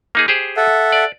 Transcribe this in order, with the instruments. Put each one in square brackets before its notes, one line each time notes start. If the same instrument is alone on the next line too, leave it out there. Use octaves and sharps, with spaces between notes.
[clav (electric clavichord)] A#3 D#4 G#4
G4 G#4 C5
[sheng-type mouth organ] A4 E5 F#5
[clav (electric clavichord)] D5